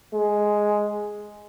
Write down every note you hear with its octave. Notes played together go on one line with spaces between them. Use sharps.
G#3